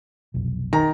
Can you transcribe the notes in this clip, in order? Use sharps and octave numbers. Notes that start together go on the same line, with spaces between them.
F1 B1
D#3 A#5